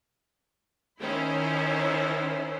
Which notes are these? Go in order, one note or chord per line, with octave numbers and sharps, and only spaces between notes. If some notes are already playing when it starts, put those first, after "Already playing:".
D#3 C#4 E4 C5